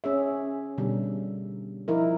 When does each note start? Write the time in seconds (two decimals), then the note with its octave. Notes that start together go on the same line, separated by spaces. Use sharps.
0.04 C#4 G#4 E5
0.78 B2 D3 G3
1.88 F3 D#4 E4 A#4